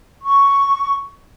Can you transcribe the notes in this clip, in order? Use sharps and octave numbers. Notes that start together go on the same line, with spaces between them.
C#6